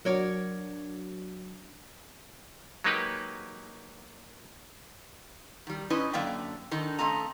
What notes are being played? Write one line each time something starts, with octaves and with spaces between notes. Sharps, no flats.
F#3 D4 F#4 A#4 C#5 D5
F#3 G#3 A#3 D#4 G4 B4
D#3 G3
C#4 D#4 E4 B4 D#5
F#2 D3 A#3 D5 E5 G5
D3 D#3 D#4
C#3 A3 C4 D#5 A#5